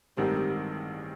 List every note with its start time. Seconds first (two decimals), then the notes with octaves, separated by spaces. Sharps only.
0.17 A1 G2 D#3 G3 G#3 C4